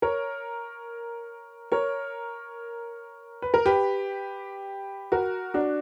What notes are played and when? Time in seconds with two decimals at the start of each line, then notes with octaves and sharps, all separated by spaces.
0.02 A#4 C#5
1.72 A#4 C#5
3.42 B4
3.54 A#4
3.66 G4 B4
5.12 F#4 A#4
5.54 D4 F#4